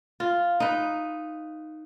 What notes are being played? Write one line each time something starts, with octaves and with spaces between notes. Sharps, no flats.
F4
D#4 B4